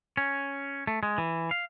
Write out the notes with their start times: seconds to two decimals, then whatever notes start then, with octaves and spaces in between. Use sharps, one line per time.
0.17 C#4
0.87 A3
1.03 G#3
1.18 E3
1.51 F5